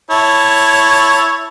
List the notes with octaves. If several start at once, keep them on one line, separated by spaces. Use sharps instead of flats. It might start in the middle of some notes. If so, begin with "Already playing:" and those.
E4 C#5 A5